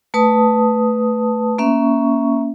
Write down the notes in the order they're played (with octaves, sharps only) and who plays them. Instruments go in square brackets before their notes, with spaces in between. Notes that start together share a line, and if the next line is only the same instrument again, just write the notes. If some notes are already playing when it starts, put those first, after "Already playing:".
[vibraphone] A3 B4 A5 D#6
A#3 C#4 E5 C#6